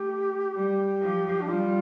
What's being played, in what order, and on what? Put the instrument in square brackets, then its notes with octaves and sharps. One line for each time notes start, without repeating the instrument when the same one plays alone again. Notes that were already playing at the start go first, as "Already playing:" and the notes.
Already playing: [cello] A3 [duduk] G4
[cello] G3 [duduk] G4
[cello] F3
[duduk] D4
[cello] G3 [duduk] F4